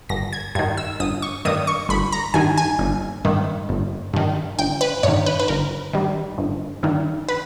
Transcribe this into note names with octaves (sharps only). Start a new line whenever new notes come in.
G1 A#6
G#6
G2 D#3 G#6
E6
G1 D#6
C#6
G2 D#3 D#6
C#6
G1 B5
A#5
G2 D#3 G#5
G#5
G1
G2 D#3
G1
G2 D#3
G1 G5
B4
G2 D#3 C#5
B4
B4
G1 A#4
G2 D#3
G1
G2 D#3
B4